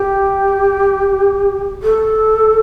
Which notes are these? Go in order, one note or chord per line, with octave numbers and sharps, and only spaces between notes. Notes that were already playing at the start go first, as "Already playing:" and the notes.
Already playing: G4
A4